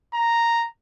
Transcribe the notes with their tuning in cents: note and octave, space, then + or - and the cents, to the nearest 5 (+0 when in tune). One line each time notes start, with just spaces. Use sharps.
A#5 -5